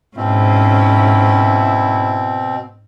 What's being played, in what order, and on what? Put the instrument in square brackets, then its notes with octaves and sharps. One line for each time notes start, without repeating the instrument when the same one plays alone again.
[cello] G#2 C#4 [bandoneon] B2 C4 [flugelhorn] E4